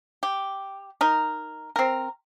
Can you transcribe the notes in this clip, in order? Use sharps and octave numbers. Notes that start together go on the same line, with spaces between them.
G4
D#4 A#4
C4 A#4